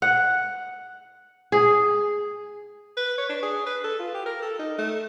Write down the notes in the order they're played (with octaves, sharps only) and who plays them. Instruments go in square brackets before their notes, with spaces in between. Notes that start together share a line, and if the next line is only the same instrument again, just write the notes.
[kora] F#5
G#4
[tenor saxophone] B4
C#5
D4
G#4
B4
A4
F4
G4
A#4
A4
D#4
A3